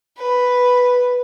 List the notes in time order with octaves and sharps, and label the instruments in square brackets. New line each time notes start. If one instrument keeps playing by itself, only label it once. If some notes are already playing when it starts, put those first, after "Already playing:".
[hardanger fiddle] B4